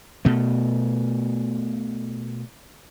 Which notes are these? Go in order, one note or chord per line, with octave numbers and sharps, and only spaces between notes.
B2 A3